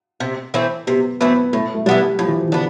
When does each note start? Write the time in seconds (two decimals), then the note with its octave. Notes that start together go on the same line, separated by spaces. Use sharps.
0.20 C3
0.54 E3 A3 C4
0.87 C3 B3
1.21 E3 A3 B3 C4
1.53 A2 A3
1.75 A3
1.86 E3 G3 B3 D4
2.19 A2 F3
2.28 E3
2.38 F3
2.48 E3
2.52 D3 B3 D4